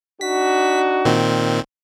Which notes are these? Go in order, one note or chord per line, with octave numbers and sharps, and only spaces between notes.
D4 D#4 F#4 B6
A#2 D#3 C4